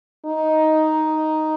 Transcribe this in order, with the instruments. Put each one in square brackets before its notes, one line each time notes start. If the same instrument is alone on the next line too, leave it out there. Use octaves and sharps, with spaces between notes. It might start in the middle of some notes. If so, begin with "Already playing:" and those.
[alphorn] D#4